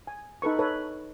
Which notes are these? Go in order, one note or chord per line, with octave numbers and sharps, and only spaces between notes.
G#5
D#4 A4 B4 C#6
A4 B4 C#5